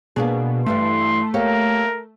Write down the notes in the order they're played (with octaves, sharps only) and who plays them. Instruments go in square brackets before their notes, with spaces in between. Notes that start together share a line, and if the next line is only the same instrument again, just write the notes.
[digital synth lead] B2 [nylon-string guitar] A#3 D4 G#4
[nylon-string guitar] G2 E3 G3 [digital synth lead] A3 [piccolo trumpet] C6
[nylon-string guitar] A#3 G4 C#5 [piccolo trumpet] A#4